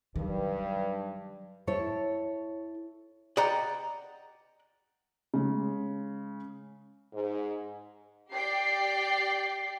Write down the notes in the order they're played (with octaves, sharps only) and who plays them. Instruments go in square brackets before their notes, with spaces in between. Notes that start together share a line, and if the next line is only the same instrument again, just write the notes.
[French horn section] G2 [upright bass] D#3 F#3
[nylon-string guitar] E4 A4 C#5
[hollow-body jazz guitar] D5 D#5 F#5 G5 A#5
[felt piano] C#3 G#3
[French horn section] G#2
[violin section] G4 D5 G5 C7